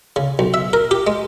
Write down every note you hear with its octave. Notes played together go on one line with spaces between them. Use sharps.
C#3
B1
E5
A#4
G4
G#3